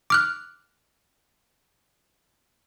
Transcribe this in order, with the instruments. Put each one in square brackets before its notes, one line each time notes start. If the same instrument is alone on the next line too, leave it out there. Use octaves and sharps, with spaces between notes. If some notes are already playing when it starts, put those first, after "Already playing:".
[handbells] D6 F6 F#6